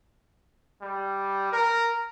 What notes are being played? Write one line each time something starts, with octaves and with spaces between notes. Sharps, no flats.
G3
A#4